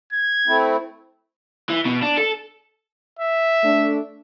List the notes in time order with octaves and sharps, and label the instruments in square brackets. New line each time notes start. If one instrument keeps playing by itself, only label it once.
[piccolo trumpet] G#6
[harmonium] A3 C4 E4
[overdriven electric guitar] E3
B2
D4
A4
[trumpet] E5
[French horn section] A3 D4